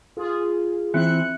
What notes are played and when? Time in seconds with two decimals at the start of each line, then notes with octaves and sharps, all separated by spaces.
0.17 F4 G#4
0.94 E3 C4 E5 F#6 C#7